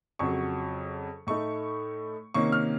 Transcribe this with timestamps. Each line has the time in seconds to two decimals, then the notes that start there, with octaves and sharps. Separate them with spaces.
0.19 F2 C#3 F#3 C#6
1.27 A2 A3 D#4 C#6
2.34 C3 D#3 A#3 C#4 C#6
2.52 F6